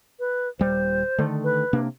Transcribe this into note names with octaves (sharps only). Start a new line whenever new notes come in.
B4
D#1 G3 C5
D3 D#3 A3
B4
C3 A#3 D4